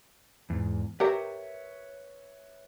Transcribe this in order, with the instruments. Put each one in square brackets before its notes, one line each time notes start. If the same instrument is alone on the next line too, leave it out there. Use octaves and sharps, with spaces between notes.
[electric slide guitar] E2 G#2
[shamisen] G4 A#4 [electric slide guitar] B4 C#5 E5